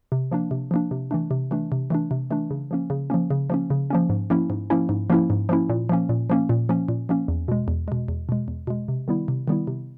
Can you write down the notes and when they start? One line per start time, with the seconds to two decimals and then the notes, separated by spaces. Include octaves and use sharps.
0.12 C3
0.31 F3 A#3 D4
0.51 C3
0.71 F3 A#3 D4
0.91 C3
1.11 E3 A3 D4
1.31 C3
1.51 E3 A3 D4
1.72 C3
1.90 E3 A3 D4
2.11 C3
2.31 E3 A3 D4
2.51 C#3
2.71 F3 A#3 C#4
2.90 C#3
3.10 F3 A#3 C#4
3.31 C#3
3.50 F3 A#3 C#4
3.70 C#3
3.90 F3 A#3 C#4
4.10 G#2
4.30 F3 A#3 C#4 E4
4.50 G#2
4.70 F3 A#3 C#4 E4
4.89 G#2
5.10 F3 A#3 C#4 E4
5.30 G#2
5.49 F3 A#3 C#4 E4
5.69 A#2
5.89 F3 A#3 C#4
6.09 A#2
6.30 F3 A#3 C#4
6.49 A#2
6.69 F3 A#3 C#4
6.89 A#2
7.09 F3 A#3 C#4
7.28 E2
7.48 B2 G#3
7.68 E2
7.88 B2 G#3
8.08 E2
8.29 B2 G#3
8.48 E2
8.67 B2 G#3
8.88 C3
9.08 D#3 G3 B3 E4
9.28 C3
9.48 D#3 G3 B3 E4
9.67 C3